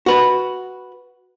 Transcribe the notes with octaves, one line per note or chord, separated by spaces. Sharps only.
F#4 B4